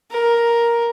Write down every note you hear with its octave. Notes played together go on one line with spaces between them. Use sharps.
A#4